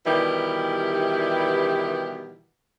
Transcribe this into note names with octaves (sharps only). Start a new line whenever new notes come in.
B2 D#3 E3 G3 G4